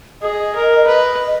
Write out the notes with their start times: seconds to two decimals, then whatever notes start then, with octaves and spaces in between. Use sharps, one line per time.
0.22 G#4 D#5
0.55 A#4
0.87 B4 D#5